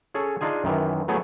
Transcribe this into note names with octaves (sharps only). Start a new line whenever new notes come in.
C#4 G#4 A4 C#5
D4 D#4 F4 G#4 G#5
F#2 D#3 E3
F#3 A3 B3 E4 G#4 C#5